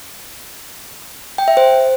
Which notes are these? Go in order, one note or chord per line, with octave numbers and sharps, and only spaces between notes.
G5
E5
C5